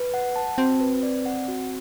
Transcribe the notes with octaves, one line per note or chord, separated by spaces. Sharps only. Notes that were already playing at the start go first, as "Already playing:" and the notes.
Already playing: B4
F#5
A5
C4 F#4
B4
D5
F#5
F#4